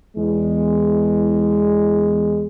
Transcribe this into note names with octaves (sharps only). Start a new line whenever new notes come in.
E2 G#3